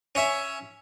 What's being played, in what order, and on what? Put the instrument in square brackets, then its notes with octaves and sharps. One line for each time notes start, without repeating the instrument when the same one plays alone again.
[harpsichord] C#4 C#5 E5